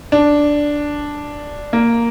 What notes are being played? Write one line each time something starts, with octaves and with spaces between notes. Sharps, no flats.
D4
A#3